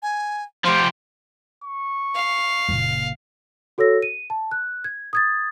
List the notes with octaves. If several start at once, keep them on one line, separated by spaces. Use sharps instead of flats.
G#5
F3 G4 C5
C#6
F5
F#1 A#2
F#4 A4 C#5 E6 A#6
D#7
A5
F#6
G#6
D#6 G#6 A6